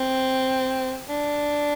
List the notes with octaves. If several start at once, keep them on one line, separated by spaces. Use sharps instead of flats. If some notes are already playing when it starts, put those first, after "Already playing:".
Already playing: C4
D4